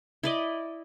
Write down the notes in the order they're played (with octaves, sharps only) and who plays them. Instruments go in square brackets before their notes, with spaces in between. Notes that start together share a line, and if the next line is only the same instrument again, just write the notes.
[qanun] E4 D5 D#5